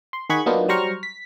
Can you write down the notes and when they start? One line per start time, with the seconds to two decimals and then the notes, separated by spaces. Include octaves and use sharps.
0.13 C6
0.30 D#3 G#4 F#5 B5 C#6 G#6
0.46 F#3 A#3 B3 D4 D#4 F4
0.68 F#3 G3 C5 A#5 C#6 F6
1.03 B6